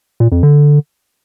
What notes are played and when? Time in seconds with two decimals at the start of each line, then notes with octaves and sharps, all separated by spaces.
0.20 A#2
0.32 F2
0.43 D3